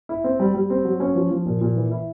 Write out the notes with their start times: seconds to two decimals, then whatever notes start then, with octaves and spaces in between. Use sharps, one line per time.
0.09 E4
0.24 C4
0.40 G3
0.55 G3
0.70 C4
0.85 F#3
1.00 C#4
1.15 F3
1.31 F3
1.46 A#2
1.61 A#2
1.76 E3
1.91 E4